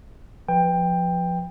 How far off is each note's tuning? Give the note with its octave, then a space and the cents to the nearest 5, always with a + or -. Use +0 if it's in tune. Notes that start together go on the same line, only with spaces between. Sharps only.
F3 +15 B4 +0 G5 +15